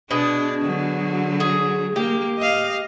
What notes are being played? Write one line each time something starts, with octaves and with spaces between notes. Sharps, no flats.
B2 D4 G#4
D3 F#3
G#4
A#3 G4
D#5 F5